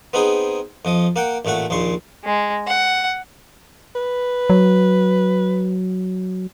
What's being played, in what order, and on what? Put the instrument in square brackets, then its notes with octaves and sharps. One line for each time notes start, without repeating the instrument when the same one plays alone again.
[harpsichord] B3 C4 D#4 G#4
F2 F3 D#5
A#3 F#5 G5
A1 A#2 A3 F#5 C#6
A#1 D#2 A#2 C6 C#6
[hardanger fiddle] G#3
F#5
[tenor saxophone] B4
[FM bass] F#3